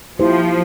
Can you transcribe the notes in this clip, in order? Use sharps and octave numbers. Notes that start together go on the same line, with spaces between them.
F3 A#3 E4 G4 C5